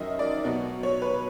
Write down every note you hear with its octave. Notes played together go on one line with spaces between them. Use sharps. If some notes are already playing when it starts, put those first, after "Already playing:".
Already playing: F#2 D#3 F#3 D#5 E5
D5
B2 F#3 B3
C#5
B4